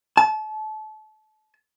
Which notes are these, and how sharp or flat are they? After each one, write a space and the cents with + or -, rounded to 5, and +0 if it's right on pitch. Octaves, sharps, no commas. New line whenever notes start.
A5 -30